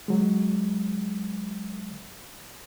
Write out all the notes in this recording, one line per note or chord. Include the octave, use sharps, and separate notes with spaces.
F#3 G#3